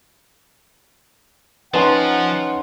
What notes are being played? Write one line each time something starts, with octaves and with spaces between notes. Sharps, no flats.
F3 C#4 D#4 B4 F#5 A#5 C6